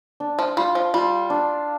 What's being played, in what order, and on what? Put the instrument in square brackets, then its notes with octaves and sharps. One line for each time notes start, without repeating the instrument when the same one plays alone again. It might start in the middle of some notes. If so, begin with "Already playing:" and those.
[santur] D4
[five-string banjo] F3
[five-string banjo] G3 [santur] F4
[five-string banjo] F3
[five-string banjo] G3 [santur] F4
[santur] D4